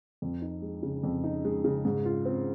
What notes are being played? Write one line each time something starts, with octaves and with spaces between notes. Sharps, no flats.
F2
D#4
G#3
C#3
F2
D#4
G#3
C#3
G#2
F4
C4